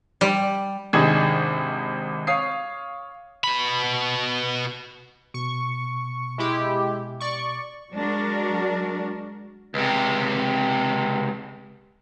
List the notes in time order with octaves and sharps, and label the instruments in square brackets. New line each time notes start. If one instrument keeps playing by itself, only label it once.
[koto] G3
[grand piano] G#1 C3 D4 D#4 G#4 G#6
C#5 F5 D#6 C7
[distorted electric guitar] B2 B5
[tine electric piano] B2 [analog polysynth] C#6
[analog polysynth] G#3 E4 G4
D5 C#6
[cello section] F#3 G#3 D4 F#4 A#4
[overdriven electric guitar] C#2 C3